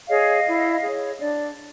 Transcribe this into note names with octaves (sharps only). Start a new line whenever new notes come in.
G#4 C#5 D#5 F5
E4
G#4 C#5
D4 D5